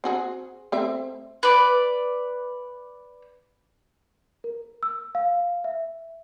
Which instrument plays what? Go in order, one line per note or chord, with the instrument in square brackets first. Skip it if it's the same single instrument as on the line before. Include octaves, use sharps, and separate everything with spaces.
[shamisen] C4 F#4 G#4
A3 C4 E5
[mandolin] B4 D5
[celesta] A#4
E6
F5
E5